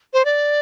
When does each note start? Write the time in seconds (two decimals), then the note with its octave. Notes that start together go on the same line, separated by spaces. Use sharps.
0.13 C5
0.25 D5